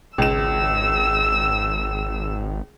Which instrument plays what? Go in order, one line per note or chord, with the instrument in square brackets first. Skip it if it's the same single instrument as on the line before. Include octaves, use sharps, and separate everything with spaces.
[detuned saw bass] G#1 [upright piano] C#2 E7 [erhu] E6